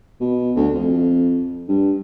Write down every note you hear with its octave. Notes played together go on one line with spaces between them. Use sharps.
B2
D2
F2
G2